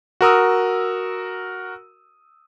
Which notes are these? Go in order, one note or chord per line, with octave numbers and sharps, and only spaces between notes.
F#4 A#4 D#6 E6